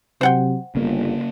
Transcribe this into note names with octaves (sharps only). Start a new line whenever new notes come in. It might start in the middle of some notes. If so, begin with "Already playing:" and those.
C3 F#3 C5 F#5 G5
G1 C#3 A#3